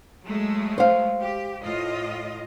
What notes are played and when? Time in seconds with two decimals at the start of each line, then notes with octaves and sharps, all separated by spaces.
0.24 F#3 G#3 A3
0.78 C5 F5
1.20 G4
1.62 A2 F4 D#5